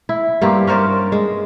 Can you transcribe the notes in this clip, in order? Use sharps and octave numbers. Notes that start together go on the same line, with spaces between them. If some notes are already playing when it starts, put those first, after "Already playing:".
E4
G2 A#3 C4 G4
C#4 A#4 C5 D5
G#3